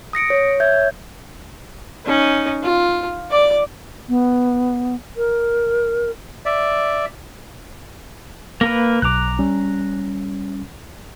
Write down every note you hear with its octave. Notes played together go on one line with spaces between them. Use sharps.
D#6 A#6 C#7 D7
C#5
C#5 E5 G6 G#6
C#4 D#4
F4
D5 D6
B3
A#4
D5 E5
A#3 A#4 B4 A#6
B1 A#5 D6 F#6
G3 C#4